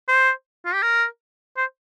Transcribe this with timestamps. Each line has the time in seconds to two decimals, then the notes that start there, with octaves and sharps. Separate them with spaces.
0.08 C5
0.65 F4
0.74 G4
0.82 A#4
1.57 C5